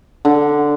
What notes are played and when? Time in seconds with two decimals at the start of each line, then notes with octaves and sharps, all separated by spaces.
0.25 D3